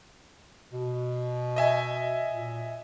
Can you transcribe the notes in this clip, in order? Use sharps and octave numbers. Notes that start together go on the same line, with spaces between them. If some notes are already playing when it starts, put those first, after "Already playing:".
B2
D#5 E5 G#5
A#2